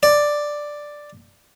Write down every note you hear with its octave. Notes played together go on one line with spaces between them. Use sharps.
D5